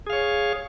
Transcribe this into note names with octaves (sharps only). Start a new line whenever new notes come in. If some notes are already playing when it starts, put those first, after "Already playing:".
G#4 C#5 F5